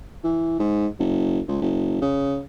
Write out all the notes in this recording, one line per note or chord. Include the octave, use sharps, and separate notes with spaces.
E3
G#2
F#1
C#2
F#1
C#3